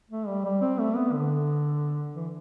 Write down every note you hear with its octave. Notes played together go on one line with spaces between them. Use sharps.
A3
G3
G3
C4
A3
B3
D3
E3